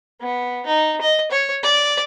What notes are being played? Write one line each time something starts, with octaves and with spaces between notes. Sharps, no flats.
B3
D#4
D#5
C#5
D5